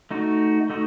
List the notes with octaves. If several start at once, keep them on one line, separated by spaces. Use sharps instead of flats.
A3 D#4 F#4
A3 D#4 F#4